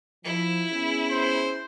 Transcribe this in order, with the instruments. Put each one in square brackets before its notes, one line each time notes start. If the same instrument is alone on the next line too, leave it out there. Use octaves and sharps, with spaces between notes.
[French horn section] F3 [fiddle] E4
[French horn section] B3 C#4 G#4
[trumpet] C5